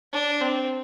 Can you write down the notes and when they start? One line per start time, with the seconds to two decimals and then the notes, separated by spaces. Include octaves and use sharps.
0.13 D4
0.41 C4